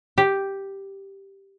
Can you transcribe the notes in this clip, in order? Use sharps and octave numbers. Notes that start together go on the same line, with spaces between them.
G4